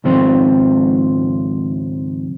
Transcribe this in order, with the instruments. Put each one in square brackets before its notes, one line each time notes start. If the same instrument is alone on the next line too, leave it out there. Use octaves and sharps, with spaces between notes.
[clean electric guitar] C#2 G#2 D#3 F3 C4 C5